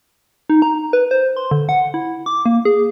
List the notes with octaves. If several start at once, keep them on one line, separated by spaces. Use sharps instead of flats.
D#4
A#5
B4
C5
C6
D3
F#5
E4
D6
A#3
G#4